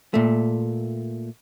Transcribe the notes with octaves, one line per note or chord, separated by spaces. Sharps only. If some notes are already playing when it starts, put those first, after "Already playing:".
A#2 A3